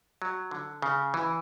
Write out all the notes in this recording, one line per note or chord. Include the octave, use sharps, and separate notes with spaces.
F#3
D3
C#3
E3